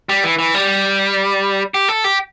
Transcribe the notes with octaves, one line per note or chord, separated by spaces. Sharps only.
G3
E3
E3
G3
G4
A4
G4